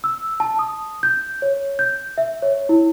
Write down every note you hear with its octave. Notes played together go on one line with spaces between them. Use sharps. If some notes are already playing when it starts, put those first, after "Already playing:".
E6
A5
D#6
G6
C#5
G6
E5
C#5
E4